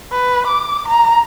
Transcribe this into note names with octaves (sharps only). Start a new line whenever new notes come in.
B4
D6
A#5